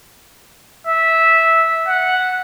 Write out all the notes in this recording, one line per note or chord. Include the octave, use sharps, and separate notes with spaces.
E5
F#5